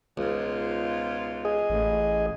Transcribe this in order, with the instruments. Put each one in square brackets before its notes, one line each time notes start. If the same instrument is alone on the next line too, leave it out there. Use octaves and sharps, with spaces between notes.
[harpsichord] C#2 [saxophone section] G#2 B2 F4
[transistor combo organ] G#4 D#5
[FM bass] A1